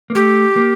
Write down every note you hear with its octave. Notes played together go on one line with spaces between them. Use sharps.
A#3
A3 G4
A#3